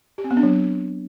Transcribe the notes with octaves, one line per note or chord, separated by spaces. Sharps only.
G4
C4
B3
D4
F#3